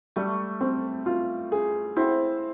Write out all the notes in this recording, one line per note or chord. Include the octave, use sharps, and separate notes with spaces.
G3 A3
C4
F4
G#4
C4 E4